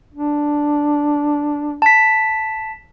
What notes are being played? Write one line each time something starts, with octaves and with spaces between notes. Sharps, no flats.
D4
A5 B6